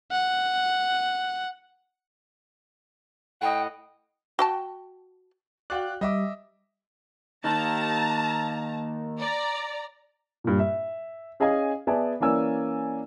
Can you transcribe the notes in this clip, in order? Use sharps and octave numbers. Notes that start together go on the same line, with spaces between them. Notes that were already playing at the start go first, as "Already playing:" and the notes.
F#5
A2 D#5 F#5 G5
F#4 G5 A5
F#4 D5 F5 G5 F#6
G3 D#5 E5 D6
D#3 A#3 D#4 A5 A#5
D5 A#5
G2 A#2
E5
C#4 G#4 D#5 F5 G#5
B3 G#4 D5 E5 G#5 A5
E3 A#3 C#4 D5 G#5 E6